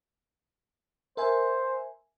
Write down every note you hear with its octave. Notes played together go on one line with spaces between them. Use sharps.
A#4 C5 E5 G#5